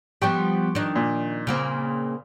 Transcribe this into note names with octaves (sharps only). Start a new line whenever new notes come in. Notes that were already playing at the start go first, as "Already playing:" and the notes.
F3 G3 B3 G4 G5 C#6
D#3 D4
A#2
C#3 A#3 C4